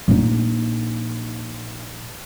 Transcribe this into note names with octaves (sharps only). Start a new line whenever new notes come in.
A#1 D#4